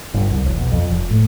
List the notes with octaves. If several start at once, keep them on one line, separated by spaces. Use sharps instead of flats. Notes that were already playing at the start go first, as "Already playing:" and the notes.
G1
C2
E1
B1
F2
F1
A2